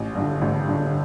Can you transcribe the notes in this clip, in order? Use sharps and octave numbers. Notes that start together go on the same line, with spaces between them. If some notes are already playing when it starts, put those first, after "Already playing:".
Already playing: A1
G2 D3
A1
G2 D3